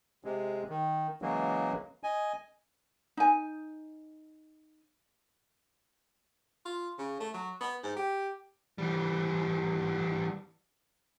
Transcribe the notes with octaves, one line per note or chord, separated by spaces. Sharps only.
C3 G#3
D#3
C#3 E3 F#3 G#3 A#3
D#5 G#5
D#4 G#5
F4
C#3
A3
F#3
B3
G#2
G4
E3 G3